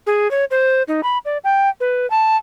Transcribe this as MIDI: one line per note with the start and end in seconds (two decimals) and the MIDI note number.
0.07 0.30 68
0.31 0.45 73
0.51 0.83 72
0.88 1.01 63
1.03 1.18 83
1.25 1.38 74
1.44 1.69 79
1.80 2.09 71
2.10 2.37 81